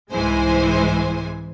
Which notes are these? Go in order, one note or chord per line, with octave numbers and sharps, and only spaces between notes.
C2 G#2 E3 G#3 C5 G#5